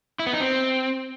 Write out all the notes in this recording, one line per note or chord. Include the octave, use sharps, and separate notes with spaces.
E4
B3
D#4
C4